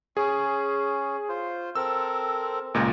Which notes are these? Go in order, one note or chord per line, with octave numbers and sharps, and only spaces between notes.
C#4 G#4
F4 C5
C4 A4 A#4 E6
C#2 A#2 D#5 A#5